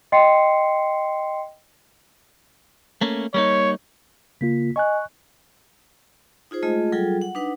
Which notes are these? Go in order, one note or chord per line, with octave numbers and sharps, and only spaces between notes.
D#5 G5 C6 C7 C#7
A3 A#3 C#4
G3 A#3 D#4 C#5
C#3 A#3 F4 B6
D#5 G#5 C#6 F#6
D#4 F4 G#4 C5
G#3 A3 F4 G#4 D#5
F#3 G3 F4 G#4 A4 G5
F#5
D4 D#4 B4 F#5